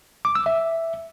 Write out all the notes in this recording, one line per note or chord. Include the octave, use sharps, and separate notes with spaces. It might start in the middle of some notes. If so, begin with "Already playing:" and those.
D6
E6
E5